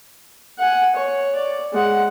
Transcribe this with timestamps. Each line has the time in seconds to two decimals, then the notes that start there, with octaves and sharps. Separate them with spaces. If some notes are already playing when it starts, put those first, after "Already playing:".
0.60 F#5 G#5
0.96 C#5
1.35 D5
1.73 G#3 F#5